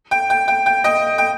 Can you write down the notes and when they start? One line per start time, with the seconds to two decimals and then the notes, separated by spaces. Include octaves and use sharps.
0.11 G5
0.30 G5
0.48 G5
0.66 G5
0.84 D#5 G5
1.18 G5